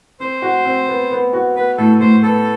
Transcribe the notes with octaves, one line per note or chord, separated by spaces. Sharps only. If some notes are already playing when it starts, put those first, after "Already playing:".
C4 C5
F#4
C4
B3
B3
F#4
B3 B4
A2 A4
A2 C5
B3 A4